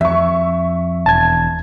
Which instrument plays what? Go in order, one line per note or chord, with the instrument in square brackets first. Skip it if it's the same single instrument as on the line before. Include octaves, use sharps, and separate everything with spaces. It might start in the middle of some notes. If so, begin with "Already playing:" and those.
[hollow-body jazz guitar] F2 [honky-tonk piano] E5 C#6
[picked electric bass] E1 [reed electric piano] A5 G#6